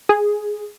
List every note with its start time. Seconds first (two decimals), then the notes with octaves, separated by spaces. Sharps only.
0.09 G#4